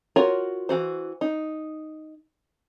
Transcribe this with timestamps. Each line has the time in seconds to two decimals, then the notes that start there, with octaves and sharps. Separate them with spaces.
0.16 F4 F#4 A#4 C#5
0.69 E3 F#4 C5
1.21 D#4